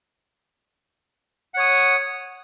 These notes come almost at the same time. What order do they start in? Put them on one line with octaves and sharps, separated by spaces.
F#5 C#5 D#6